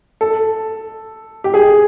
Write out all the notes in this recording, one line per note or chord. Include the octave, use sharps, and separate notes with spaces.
A4
G4
G#4